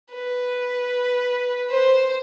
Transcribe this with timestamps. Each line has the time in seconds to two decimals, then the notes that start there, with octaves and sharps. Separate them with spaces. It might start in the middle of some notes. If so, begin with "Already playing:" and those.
0.13 B4
1.71 C5